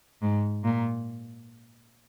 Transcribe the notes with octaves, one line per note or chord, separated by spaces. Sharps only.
G#2
A#2